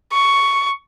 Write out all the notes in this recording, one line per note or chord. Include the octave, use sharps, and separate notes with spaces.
C#6